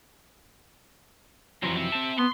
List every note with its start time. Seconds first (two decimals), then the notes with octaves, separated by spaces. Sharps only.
1.63 F2 E3 F#3 C4 A#4
1.76 G4 E5
1.92 C4 A5
2.18 B3 C6